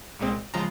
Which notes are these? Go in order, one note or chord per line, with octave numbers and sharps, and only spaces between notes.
C2 A#2 G#3 C4
C#3 F3 G#3 A#5